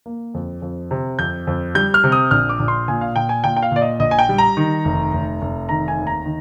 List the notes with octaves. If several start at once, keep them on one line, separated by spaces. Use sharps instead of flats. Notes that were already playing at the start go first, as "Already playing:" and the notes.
A#3
F2
F2
C3
F2 G6
F2
G3 G6
F6
C3
D#6
A#1 F6
D6
A#1
C6
A#2 G#5
F5
A#2 G5
G#5
A#2 G5
G5
F5
A#2 D5
D#5
A#1 D#5
G#5
G5
G3
A#5
D#3
F1
F1
F1
D#3 A#5
G#5
D#2
A#5
D#3